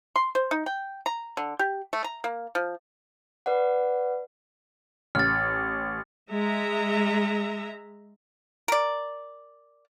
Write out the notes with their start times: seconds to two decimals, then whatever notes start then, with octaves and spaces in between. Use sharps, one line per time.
0.16 C6
0.35 C5
0.51 D#4
0.66 G5
1.06 A#5
1.37 D3
1.59 G4
1.93 A3
2.04 A#5
2.24 A#3
2.55 F3
3.46 B4 D5 F#5
5.15 A1 F6 A6
6.30 G#3 E5 A#5
8.68 A#4 D5